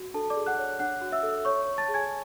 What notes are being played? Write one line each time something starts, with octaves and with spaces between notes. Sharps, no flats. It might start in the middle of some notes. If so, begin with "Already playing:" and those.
Already playing: F#4
D4 A4 A5
D5 D6
G#4
F#5 F#6
C#5
D4 F#5 F#6
F#4
E5 E6
A4
C#5 C#6
C#5
A5 A6
G#4
G#5 G#6